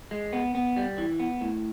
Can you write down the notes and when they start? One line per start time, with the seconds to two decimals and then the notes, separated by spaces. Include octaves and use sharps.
0.11 G#3
0.33 B3
0.55 B3
0.77 G3
0.98 E3
1.20 B3
1.41 A2